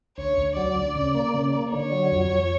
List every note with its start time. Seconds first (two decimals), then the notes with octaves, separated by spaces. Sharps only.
0.18 D2 C#5
0.37 D2
0.56 F#3 D5
0.76 D2
0.95 C#3
1.14 A#3
1.34 C#3
1.53 A#3
1.72 D3 C#5
1.92 F#3
2.12 F2
2.31 F2